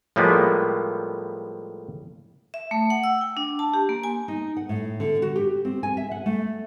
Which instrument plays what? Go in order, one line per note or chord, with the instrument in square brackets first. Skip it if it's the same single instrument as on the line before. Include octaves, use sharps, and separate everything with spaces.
[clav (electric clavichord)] A2 F3 G3 G#3 A#3 B3
[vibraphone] E5
A3
F#5
E6
G5
D4
A5
G4
A#3
G#5
[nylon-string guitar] D#4
F#5
A2
D3
F#4
G4
C4
G#5
E5
F#5
A3